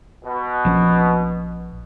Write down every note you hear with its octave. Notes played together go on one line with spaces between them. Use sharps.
B2
A#1 F3 C#4